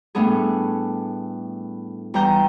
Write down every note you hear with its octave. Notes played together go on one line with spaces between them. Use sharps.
A2 G3 A3 B3 D4 G#4
E2 G3 G5 A#5 G6